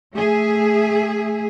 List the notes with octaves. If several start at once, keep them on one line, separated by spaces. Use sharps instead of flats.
A3 G#4 E5